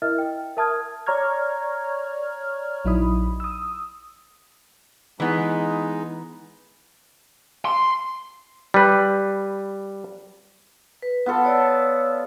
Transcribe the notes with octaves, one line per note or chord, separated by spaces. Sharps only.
E4 A#4 D#5 E5 F6
G5
A#4 E5 A5 D#6 F6 G#6
C#5 D5 A#5 C#6 F6 G#6
A#1 F#3 D#4 E4 B5 D#6
D#6 E6
E3 G#3 B3 D#4
C6
G3 B4
B4
B3 F4 A4
C#5 D5 E6